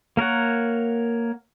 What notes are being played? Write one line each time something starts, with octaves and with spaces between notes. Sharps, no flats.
A#3 A#4 C#5 F#5